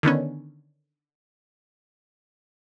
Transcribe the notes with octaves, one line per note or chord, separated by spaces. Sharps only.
D3 D#3 B3 C#4